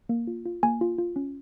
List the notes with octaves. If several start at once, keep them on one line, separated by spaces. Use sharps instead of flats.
A#3
F4
F4
A#3 G#5
F4
F4
C#4